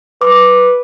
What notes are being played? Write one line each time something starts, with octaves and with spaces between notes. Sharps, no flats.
B4 D6